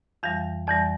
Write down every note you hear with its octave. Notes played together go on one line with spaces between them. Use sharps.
F2 E3 G3 F5
F2 E3 G3 D5